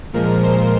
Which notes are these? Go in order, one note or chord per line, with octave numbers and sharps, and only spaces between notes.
A#2 F3 G#3 A#4
C5